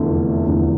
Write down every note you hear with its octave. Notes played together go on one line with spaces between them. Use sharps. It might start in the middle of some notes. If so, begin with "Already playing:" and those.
Already playing: F1 E2 D3 A3
F1 E2 D3 A3